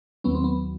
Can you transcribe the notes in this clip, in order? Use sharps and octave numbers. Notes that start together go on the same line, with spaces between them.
D#2 D#3 F#3 B3 C#4
C4
B3